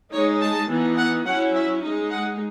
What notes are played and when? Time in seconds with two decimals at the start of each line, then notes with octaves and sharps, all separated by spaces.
0.12 G#3 D#4 C#5
0.41 A5
0.69 E3 B3 D#4
0.98 F#5
1.25 F#3 C#4 E4 F#5
1.54 E5
1.82 G#3 D#4
2.11 F#5